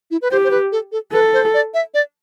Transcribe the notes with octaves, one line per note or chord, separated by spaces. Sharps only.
E4
B4
G4 C5
C5
B4
A4
A4
A4 B4
C5
D5
E5
D5